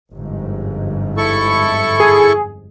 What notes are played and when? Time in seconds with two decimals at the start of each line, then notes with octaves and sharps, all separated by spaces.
0.13 G1 F2 G#2
1.17 E4 A4 C#6
2.00 G#4